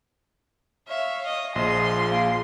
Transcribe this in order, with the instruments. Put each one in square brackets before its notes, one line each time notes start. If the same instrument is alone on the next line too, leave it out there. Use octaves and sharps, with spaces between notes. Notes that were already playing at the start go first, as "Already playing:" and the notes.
[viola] C#5 F5 [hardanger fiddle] E5
[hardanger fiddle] D#5
[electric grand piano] A#1 [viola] F3 G#4 [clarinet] D#5 [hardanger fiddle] C6
[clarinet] A#3